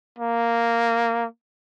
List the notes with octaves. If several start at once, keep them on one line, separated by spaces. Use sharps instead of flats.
A#3